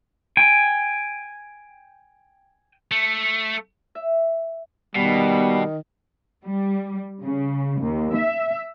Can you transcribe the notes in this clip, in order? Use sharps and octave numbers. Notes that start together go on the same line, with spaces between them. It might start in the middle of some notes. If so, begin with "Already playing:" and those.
G5 G#5
A3
E5
B2 D#3 G3 B3
G3
C#3
D#2
E5